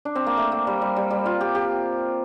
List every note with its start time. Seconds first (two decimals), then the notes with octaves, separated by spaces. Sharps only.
0.05 D4
0.15 C4
0.27 A#3
0.37 A3
0.52 A#3
0.67 G3
0.82 G3
0.96 G3
1.10 G3
1.26 F4
1.41 G4
1.55 G4